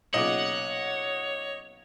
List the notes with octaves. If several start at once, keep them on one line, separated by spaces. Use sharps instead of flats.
B1 A#2 C#3 C#5 D#5 F#5 D6